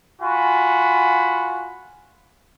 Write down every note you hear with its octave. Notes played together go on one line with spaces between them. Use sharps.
F4 F#4 G#5 B5